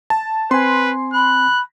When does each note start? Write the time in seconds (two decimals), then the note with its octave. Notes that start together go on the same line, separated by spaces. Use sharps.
0.10 A5
0.51 C4 B4 G#5 C6
1.14 B5 F#6